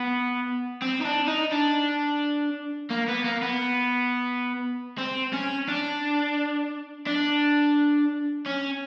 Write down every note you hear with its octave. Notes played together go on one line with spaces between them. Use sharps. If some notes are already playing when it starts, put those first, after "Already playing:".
Already playing: B3
C4
D#4
D4
D#4
D4
A#3
B3
A#3
B3
C4
C#4
D4
D4
C#4